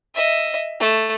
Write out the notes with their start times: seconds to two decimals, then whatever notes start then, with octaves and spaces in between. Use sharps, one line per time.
0.15 D#5 E5
0.80 A3